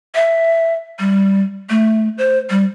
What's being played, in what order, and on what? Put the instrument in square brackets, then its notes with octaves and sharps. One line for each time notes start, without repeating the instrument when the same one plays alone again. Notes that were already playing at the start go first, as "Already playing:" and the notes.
[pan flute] E5
G3
A3
C5
G3